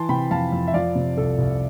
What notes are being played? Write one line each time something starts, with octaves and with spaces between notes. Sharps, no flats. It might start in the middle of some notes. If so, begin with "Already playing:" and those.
Already playing: E3 A5 C6
C3 G5 B5
F2 F5 A5
F2
E5
F3 D5 F5
C3
C2 A4
C2